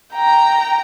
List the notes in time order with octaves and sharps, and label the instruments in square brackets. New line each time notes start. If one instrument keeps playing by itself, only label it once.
[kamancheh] G5 A#5